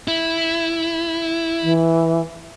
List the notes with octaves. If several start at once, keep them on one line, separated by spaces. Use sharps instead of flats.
E4
E3